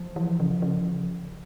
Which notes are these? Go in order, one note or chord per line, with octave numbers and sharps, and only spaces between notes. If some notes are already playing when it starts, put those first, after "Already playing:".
Already playing: F3
E3
C#3
C#3